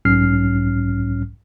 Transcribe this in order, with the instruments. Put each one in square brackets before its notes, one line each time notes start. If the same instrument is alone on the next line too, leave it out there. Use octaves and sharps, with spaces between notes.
[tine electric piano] B1 G#2 F#3 C#4 F6 C7